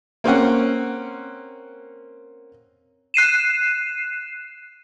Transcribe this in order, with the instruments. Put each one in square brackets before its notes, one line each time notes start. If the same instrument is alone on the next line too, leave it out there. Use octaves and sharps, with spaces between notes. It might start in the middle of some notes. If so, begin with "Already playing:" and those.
[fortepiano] A#3 C4 C#4 F#5
[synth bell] F#6 C7 D#7 E7